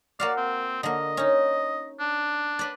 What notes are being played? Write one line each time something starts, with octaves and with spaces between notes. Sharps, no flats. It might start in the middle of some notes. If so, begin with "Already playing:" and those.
A#3 F#4 D5 F5
C4
D3 A#3 D#5
C#4 D#4
D4
B4 D5